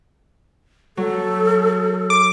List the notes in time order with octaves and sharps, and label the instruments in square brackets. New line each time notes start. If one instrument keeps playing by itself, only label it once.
[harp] F#3 [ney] A4
[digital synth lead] D6